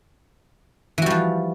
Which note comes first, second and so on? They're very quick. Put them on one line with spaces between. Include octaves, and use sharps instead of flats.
E3 F#4 G3 F3